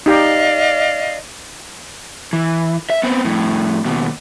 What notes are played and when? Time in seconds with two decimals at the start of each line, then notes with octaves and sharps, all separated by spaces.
0.06 D#4 G4 D5 D#5 F5 G5
2.33 E3
2.90 E5
3.03 B3 C4
3.25 F2 A2
3.85 D#2 B2